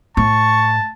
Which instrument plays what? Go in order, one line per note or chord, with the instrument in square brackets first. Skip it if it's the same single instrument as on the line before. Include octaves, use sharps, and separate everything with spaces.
[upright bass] A2 [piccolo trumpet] A5 [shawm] C#6